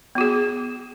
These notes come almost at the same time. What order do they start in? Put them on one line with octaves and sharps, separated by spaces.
B3 F#4 G#4